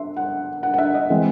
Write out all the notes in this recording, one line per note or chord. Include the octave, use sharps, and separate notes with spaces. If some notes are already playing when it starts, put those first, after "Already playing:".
Already playing: E5 C6
F#5
F#5
F#5
E5
D#5
E3 G#3 C4 G#4